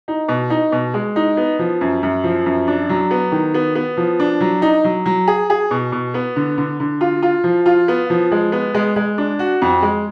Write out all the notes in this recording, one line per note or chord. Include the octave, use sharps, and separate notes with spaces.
D#4
B2
D#4
B2
G#3
D#4
B3
F3
F#2
F#2
F3
F#2
D4
F#3
B3
D#3
B3
B3
F3
D4
F#3
D#4
F#3
F#3
G#4
G#4
B2
B2
B3
D3
D3
D3
F4
F4
F3
F4
B3
F3
G#3
B3
G#3
G#3
D4
F#4
F2
G#3